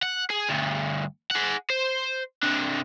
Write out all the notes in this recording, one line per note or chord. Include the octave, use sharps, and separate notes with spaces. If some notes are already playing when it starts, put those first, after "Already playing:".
F#5
G#4
D2 G2
G#4 F#5
C5
C3 D4